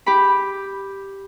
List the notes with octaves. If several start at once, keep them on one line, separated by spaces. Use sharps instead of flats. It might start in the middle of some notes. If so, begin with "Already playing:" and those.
G4 B5